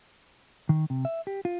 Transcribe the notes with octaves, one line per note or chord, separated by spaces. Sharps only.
D#3
C3
E5
G4
F4